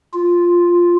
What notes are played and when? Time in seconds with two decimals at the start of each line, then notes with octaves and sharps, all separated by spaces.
0.14 F4